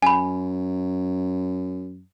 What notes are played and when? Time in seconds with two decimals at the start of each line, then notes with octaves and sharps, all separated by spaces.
0.02 F#2 G#5 B5